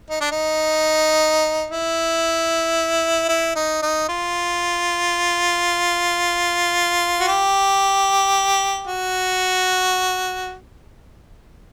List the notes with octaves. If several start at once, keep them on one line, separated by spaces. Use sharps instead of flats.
D#4
D4
D#4
E4
E4
D#4
D#4
F4
F#4
G4
F#4